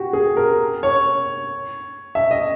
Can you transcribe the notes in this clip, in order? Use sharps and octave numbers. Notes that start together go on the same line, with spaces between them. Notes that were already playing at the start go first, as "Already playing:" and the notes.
Already playing: F#4 G4
G#4
A#4
C#5
E5
D#5